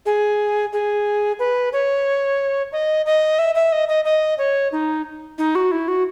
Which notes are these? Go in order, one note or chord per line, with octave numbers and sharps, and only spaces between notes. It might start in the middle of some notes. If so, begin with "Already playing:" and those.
G#4
G#4
B4
C#5
D#5
D#5
E5
E5
D#5
D#5
D#5
C#5
D#4
D#4
F#4
E4
F#4